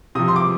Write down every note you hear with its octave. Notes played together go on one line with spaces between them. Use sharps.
C3 F3 D#6
C6
D6